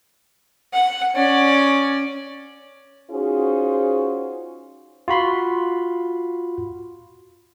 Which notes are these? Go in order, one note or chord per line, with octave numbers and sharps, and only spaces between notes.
F#5
C#4 D5
C#4 D#4 F4 F#4 G#4 C5
F4 F#4 B5 C6